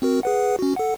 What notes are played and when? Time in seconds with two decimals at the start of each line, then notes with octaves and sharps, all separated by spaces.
0.02 C4 F#4 A#4
0.23 G#4 B4 F#5
0.59 C#4 F#4
0.76 A4 F#5